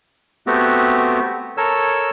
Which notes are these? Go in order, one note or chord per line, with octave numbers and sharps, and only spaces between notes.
A3 B3 C4 F#4 G4
A4 A#4 C#5 E6